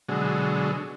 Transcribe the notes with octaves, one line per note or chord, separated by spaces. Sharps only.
B2 D3 F#3 G#3